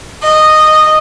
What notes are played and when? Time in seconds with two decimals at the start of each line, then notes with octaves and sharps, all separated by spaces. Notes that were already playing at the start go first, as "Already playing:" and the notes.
0.23 D#5